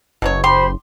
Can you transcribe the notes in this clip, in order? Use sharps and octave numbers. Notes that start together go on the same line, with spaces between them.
F#1 B2 F#3 C#5
G4 C5 B5 C6